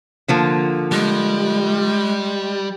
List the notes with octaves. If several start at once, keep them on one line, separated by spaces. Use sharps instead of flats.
D3 F3 A#3
G3 G#3